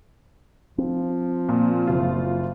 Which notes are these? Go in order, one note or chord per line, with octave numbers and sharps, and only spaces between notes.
F3 C4
A#2
F#1 F4